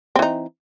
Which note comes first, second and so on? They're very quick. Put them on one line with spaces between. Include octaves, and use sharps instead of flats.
C4 E3 D#4